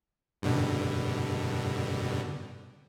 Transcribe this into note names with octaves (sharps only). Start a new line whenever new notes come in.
G2 B2 D3